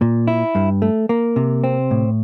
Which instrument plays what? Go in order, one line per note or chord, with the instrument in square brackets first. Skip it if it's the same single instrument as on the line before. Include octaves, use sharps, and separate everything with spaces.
[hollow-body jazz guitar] A#2
E4
G2
A3
A#3
C3
C4
A2